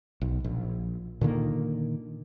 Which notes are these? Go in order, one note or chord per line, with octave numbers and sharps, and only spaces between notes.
B1
A#1
A#2 D3 D#3 A#3